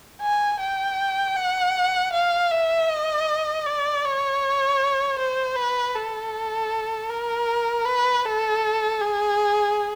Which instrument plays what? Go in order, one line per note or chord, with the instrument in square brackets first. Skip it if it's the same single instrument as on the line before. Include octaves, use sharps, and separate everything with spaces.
[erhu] G#5
G5
F#5
F5
E5
D#5
D5
C#5
C5
B4
A4
A#4
B4
A4
G#4